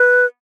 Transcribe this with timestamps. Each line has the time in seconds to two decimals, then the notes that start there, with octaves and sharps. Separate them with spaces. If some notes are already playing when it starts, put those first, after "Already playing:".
Already playing: B4